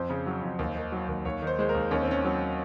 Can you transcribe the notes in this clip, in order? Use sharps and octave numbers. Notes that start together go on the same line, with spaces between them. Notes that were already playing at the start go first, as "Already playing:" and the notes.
Already playing: F2 C5
C#3
F#3
F2
D#2
D#3
F#3
D#2
D#2 C#5
D#3
C5
G#3 C5
A#4
D#2
D#2 C#4
C4
D#3 C#4
F#3 C4